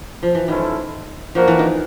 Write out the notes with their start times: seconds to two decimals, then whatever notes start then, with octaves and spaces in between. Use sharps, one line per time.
0.23 F3
0.35 E3
0.47 D#3 G#3 C#4 E4 A4 C5
1.35 F3 A#3 D4 F#4 A#4
1.48 E3
1.59 D#3